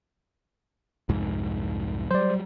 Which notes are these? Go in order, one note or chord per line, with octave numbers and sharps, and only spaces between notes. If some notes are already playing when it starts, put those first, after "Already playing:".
C2 F2 G#2
F#3 G3 C5 D5